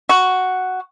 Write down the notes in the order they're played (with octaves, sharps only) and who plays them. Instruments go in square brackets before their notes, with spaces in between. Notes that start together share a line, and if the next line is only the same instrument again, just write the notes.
[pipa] F#4